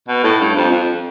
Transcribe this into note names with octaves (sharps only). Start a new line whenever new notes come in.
B2
A2
G2
F2
F2